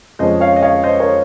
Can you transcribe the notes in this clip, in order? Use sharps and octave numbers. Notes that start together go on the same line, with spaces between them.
F2 C#3 F3 G#3 C#4 C5 D#5
C#5 F5
D#5
C#5 F5
C5 D#5
A#4 C#5